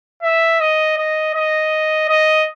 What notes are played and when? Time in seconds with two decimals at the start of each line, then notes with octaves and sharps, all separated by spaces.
0.23 E5
0.60 D#5
0.97 D#5
1.35 D#5
2.09 D#5